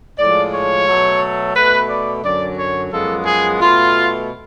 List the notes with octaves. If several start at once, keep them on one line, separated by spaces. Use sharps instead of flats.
A2 F3 G#3 D5
C#5
B2 F#3 A3
B2 A3 B4
D5
F#2 D3 F#3 D5
C#5
F#2 F3 G#3 B3 A4
G#4
B2 A3 F4